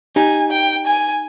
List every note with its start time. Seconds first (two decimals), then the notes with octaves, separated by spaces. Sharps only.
0.16 D#4 G4 G#5
0.51 G5
0.86 G#5